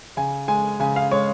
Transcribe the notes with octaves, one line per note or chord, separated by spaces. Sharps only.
C#3 G#5
G#3 G#5
C#3 G#5
F5
G#3 C#5